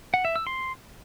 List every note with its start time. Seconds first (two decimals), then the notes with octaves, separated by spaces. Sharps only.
0.14 F#5
0.25 E5
0.36 E6
0.47 C6